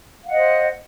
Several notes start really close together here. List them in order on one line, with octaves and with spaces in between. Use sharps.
F5 F#5 D#5 C5